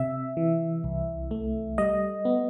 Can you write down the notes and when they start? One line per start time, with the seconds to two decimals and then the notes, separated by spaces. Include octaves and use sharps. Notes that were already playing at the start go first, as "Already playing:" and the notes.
Already playing: C3 E5
0.37 E3
0.84 C2
1.31 A3
1.78 G3 D#5
2.25 B3